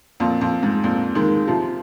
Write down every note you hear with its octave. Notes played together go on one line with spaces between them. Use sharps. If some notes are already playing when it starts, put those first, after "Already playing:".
F2 A#2
F2
G#2
F2 A#2
D#3 G#3
C3 F3